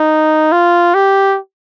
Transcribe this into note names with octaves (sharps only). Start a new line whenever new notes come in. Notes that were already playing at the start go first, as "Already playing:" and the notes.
Already playing: D#4
F4
G4